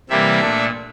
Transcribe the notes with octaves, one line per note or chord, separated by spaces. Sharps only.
C3 E3 G3 A#3 E5
A#2 A3 D4